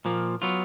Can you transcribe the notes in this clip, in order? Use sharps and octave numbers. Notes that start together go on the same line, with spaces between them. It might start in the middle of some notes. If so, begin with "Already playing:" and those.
A#2 F3 A#3
F#3 B3 F4